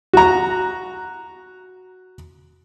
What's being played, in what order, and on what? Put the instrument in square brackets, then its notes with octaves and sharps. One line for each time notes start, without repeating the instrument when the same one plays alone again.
[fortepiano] F#4 A#5